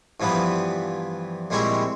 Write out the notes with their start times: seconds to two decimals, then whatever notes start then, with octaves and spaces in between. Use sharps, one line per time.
0.20 G2 E3 F3 B3 B4
1.50 A#1 G3 G#3 C4 E4 C#6